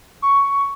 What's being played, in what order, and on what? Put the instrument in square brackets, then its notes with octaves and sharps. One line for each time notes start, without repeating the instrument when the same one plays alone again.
[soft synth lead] C#6